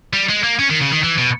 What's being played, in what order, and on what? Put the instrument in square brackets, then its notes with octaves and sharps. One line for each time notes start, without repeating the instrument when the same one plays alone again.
[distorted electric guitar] G3
G#3
A#3
C#4
D#3
C#3
D#3
E3
B2